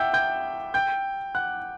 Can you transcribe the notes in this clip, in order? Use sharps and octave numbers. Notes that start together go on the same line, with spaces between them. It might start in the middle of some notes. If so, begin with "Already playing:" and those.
Already playing: E5 F#5 G5 E6 G6
G5 G6
G5 G6
F#5 F#6